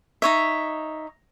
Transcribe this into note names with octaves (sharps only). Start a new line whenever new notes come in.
D#4 C#5 E5